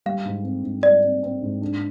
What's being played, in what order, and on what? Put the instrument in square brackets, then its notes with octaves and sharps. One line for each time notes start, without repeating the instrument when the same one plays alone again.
[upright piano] G3 [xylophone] F5
[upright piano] G#2
C4
G#2
[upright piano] G3 [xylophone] D5
[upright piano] C4
C4
G#2
D4